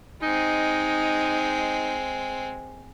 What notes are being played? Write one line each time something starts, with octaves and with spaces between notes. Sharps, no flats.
G#3 C4 D#4